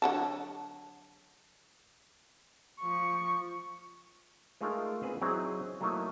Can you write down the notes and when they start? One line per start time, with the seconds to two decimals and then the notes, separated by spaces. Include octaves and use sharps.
0.02 D3 F#3 A5
2.80 F3 C#6
4.61 G#3 A3 D#4 F4 G#4 A#4
5.02 B3 C4 G#4 B4 C5
5.22 F#3 C4 D#4 E4 G#4
5.81 F#3 A3 A#3 D#4 E4